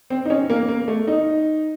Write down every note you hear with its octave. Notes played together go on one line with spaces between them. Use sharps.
C4
D#4
C#4
A#3
A#3
A3
D#4